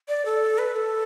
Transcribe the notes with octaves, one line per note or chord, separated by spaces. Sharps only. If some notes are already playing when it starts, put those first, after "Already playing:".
D5
A4
B4
A4